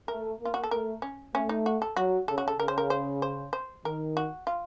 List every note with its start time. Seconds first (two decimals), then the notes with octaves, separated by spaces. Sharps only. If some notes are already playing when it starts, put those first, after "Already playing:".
0.08 A3 A#4
0.41 A#3 F4
0.54 F#4
0.63 A4
0.71 A3 A#4
1.02 C#4
1.35 A3 C#4
1.49 D#4
1.66 F#4
1.82 A4
1.96 F#3 F#4
2.28 C#3 A4
2.38 F#4
2.48 A4
2.59 C#3 A#4
2.68 C5
2.78 A#4
2.90 C5
3.22 C5
3.53 C5
3.85 D#3 A#4
4.17 F#4
4.47 F4